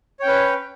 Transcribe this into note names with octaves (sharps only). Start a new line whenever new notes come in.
C#4 B4 C#5 G5